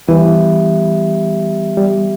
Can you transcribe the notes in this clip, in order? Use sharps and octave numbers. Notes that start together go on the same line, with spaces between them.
E3 G3 B3 G4 E5
G3